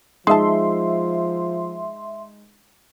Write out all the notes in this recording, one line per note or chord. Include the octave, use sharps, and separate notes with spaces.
F3 G#3 D#4 G#4 E5 A5 C6